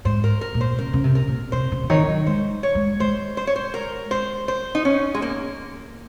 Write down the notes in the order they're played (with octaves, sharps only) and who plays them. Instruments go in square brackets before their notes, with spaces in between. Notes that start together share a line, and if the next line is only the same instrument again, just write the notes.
[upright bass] G#2 [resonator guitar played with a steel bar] C5
[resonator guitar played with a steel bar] A#4
A#4
[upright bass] A#2
[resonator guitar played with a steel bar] C5
[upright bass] C#3 [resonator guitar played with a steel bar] A#4
[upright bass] C#3
C3
[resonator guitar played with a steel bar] A#4
[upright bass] A#2
[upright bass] C3 [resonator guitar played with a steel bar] C5
[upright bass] C#3
C#3
[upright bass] D#3 [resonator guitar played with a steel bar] C#5
[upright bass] F#3
[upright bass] G#3 [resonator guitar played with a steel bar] C5
[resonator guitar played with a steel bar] C#5
[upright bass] G#3
[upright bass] G#3 [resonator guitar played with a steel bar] C5
[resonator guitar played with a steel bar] C5
C#5
C5
A#4
C5
C5
D#4
C#4
G#3
A#3